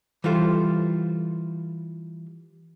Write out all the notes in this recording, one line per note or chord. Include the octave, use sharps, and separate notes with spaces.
E3 G3 F4 A4 C5